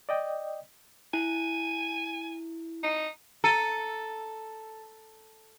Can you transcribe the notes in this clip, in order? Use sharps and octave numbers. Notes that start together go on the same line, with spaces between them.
D5 D#5 G5
E4 G#5
D#4
A4 A#5 C#7 D#7